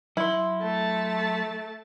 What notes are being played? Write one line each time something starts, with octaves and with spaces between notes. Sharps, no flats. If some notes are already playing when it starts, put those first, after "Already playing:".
F#3 E4 C6
A3 A5